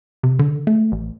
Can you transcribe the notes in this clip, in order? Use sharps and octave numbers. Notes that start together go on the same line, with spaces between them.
C3
D3
A3
A1